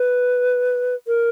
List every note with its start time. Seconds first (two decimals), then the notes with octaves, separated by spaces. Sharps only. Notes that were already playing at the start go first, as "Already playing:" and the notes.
Already playing: B4
1.07 A#4